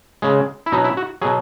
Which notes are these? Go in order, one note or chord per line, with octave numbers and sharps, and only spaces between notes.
C#3 G#3
E4
B2 F#3 D#4
E4
F#4
B2 F#3 G#4